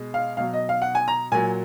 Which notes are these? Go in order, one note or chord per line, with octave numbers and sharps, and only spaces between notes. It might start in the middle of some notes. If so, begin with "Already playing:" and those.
Already playing: B2 G#3
F5
B2 F#3 F5
D#5
F5
F#5
G#5
A#5
A#2 F#3 G#5